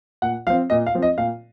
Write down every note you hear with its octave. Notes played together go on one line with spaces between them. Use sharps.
A#2 F#5
F3 C4 F5
A#2 D#5
F5
F3 C4
D#5
A#2 F5